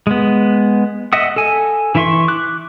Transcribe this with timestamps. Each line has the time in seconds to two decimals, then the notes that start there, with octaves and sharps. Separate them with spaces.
0.07 G#3 B3
1.13 D#5 E5 F#5 D#6
1.36 A4 G#5
1.95 E3 E4 E5 C6 C#6
2.28 D6 F#6